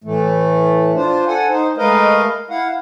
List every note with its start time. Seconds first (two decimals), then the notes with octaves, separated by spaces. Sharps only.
0.04 A2 E3 A3
0.95 D4 F4 C5
1.27 A4 F#5 G#5
1.49 D#4 C5
1.78 G#3 A3 A#4 B4 D#5 F5
2.50 E4 F5 F#5